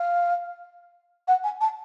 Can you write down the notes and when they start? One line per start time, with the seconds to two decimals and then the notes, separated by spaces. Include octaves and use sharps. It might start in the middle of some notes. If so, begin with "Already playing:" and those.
Already playing: F5
1.27 F#5
1.43 G#5
1.61 A5